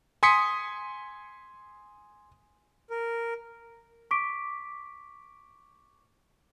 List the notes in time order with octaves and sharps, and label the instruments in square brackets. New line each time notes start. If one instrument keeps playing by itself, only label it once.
[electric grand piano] G#5 C6 D#6 B6 C#7
[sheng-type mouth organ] A#4
[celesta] C#6 D6 B6 D7